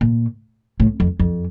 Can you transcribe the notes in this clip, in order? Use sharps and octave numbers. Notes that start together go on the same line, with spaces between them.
A#2
A2
F2
F2